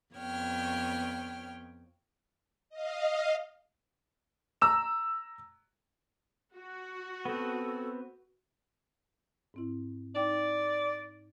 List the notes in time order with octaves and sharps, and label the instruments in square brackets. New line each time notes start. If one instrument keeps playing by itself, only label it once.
[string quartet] F2 B3 C#5 G5 F6
[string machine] D#5 F5
[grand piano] A#5 E6 E7
[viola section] F#4
[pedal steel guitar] B3 C4 [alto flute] A4
[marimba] G#2 C4 E4
[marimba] D#4 G5 [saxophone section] D5